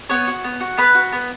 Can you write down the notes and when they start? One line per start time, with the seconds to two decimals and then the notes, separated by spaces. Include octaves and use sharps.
0.10 B3 C#5
0.27 F#4
0.44 B3
0.60 F#4
0.77 B3 B4
0.95 F#4
1.13 B3